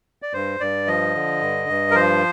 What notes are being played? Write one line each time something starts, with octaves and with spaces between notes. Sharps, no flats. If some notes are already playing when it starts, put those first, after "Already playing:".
D5
G2 C5
G2 D5
F3 D#5
D3
G2
G2
A#4
F3 C5